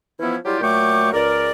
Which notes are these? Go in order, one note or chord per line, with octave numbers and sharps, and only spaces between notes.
E3 F3 B3 C#4 E4
F#3 G3 E4 F4 G4
A#2 F#3 A3 G5 C#6 D6
C#2 A#4 D5